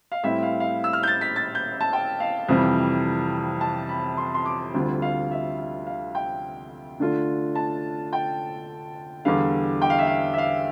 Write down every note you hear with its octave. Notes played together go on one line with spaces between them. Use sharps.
F5
A2 G3 C4 E4 E5
F5
F5
E6
F6
G6
A6
B6
A6
G6
A5
G5
F5
F2 C3 E3 G3
A5
B5
C6
C6
D6
D2 D3 G3 C4 F4
F5
E5
F5
F5
G5
D3 A3 D4 F4
A5
G5
E2 D3 G3 F5
G5
F5
E5
F5
E5
F5